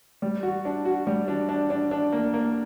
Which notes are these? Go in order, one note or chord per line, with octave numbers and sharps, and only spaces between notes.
G3
F#4
D4
F#4
G3
D4
D4
D4
D4
A#3
A#3